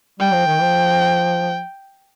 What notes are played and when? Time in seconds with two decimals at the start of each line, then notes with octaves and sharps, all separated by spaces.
0.20 G3 G5
0.33 F3
0.47 D#3
0.61 F3